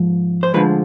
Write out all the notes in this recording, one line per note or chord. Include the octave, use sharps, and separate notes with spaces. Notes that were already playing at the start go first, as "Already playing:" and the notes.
Already playing: G#2 F3
C5
D2 D3 F3 G#3 B4